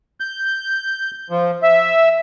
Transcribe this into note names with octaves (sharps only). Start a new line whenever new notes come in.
G6
F3
E5